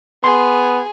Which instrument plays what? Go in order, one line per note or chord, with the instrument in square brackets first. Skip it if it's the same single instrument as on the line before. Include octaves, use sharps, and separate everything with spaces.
[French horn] B3 [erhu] G#4 [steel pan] C6